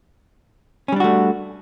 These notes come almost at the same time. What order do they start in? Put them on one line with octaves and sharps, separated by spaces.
C#4 G3 D4 F#4 A3